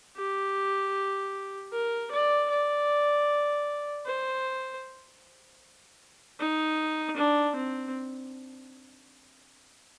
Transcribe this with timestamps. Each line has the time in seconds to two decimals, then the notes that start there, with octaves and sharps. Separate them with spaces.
0.17 G4
1.73 A#4
2.12 D5
2.50 D5
4.06 C5
6.39 D#4
7.17 D4
7.56 C4